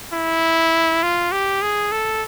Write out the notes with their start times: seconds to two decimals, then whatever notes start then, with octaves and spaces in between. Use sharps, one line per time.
0.13 E4
1.03 F4
1.32 G4
1.62 G#4
1.92 A4